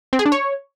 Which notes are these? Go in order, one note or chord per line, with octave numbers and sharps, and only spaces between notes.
C4
G#4
D4
C#5